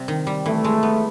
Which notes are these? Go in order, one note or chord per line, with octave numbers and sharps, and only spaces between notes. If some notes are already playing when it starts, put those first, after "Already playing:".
Already playing: C3 G3
D#3
G3
E3 A3
G#3
B3